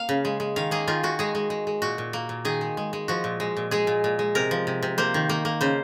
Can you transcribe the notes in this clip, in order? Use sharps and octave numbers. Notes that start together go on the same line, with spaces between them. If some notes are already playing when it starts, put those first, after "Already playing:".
Already playing: A#3 F5
C#3
G#3
G#3
D#3 F5
A#3 G#4
D#3 F4
D#3 F#4
G#3 G#4
G#3
G#3
G#3
A#2 F#4
A#2
A#3
A#2
D#3 G#4
G#3
G#3
G#3
F3 F#4
A#2
G#3
A#2
G#3 G#4
A#2
A#2
G#3
C3 A#4
F3
C3
C3
A#3 C5
D#3
A#3
A#3
C#3 C5